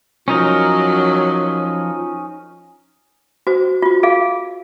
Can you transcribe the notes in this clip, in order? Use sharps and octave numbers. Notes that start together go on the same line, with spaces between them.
F3 F#3 C#4 D#4 A#4
F#4 C5
F4 F#4
G#4 F5